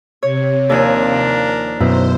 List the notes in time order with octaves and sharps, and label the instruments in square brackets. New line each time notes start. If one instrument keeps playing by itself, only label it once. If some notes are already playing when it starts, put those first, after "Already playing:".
[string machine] C3 [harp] C#5
[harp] D#2 F3 G#5 [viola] D4 A#4
[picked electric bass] F#2 B2 [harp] E4 [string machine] C5